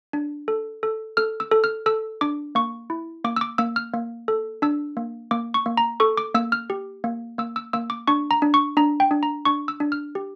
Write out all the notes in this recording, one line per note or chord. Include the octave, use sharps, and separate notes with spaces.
D4
A4
A4
A4 F6
E6
A4
F6
A4 E6
D4 D6
A#3 C#6
E4
A#3 D6
E6
D6
A#3 E6
F6
A#3
A4
D4 E6
A#3
A#3 D6
C#6
A#3
A#5
A4 C#6
D6
A#3 E6
F6
G4
A#3
A#3 E6
E6
A#3 E6
D6
D4 C#6
A#5
D4
C#6
D4 A#5
G5
D4
A#5
D4 C#6
E6
D4
F6
G4